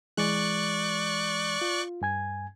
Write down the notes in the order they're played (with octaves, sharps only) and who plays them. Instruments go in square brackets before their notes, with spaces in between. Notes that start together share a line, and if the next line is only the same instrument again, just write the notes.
[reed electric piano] E3 G#3 [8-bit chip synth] D5 C#6 F#6
[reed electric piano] F4
G2 G#5 G#6